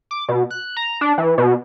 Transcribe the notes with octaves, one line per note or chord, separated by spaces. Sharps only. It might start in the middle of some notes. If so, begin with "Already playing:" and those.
D6
B2
F#6
A#5
D4
E3
B2